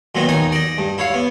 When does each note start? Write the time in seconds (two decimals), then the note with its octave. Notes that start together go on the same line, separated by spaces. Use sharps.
0.15 A#2 D#3 F#3 B3
0.29 D#2 D#4 G#5 D#6
0.52 D5 D#5
0.78 G2
0.98 E4 C#5 F5
1.14 B3